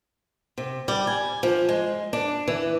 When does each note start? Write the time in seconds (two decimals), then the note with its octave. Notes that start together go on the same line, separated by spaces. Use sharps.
0.58 C3
0.88 G3
1.07 G#5
1.43 F3
1.69 G#3
2.13 D4
2.48 E3